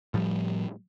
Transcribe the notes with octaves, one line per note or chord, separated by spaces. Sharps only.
A2 F3 G3